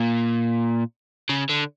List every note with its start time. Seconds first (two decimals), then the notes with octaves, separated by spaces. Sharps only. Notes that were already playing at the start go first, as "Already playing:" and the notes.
Already playing: A#2
1.29 C#3
1.50 D3